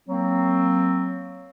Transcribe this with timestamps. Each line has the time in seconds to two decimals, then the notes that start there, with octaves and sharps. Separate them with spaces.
0.08 F#3 A#3 C4